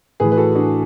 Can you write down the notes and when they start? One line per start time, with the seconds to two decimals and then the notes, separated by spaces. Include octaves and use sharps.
0.20 A2 E3 G#4 B4
0.32 B4
0.37 F#4 A4
0.55 D4 F#4